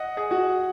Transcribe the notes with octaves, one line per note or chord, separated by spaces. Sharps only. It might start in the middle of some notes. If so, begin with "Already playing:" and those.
Already playing: D#5 F#5
G#4
F#4